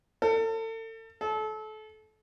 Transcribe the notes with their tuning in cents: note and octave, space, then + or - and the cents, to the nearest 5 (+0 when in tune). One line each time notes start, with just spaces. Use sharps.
A4 +35
A4 -30